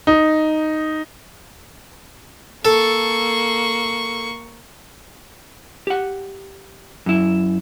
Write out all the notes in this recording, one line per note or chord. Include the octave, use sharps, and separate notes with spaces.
D#4
A#3 A4 C#6
G4 F#5
F#2 E4